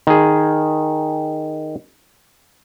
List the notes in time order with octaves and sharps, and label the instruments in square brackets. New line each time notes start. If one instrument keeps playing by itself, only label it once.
[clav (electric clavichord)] D#3 G#4